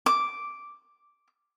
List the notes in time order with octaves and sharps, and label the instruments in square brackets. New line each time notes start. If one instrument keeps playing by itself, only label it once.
[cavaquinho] D6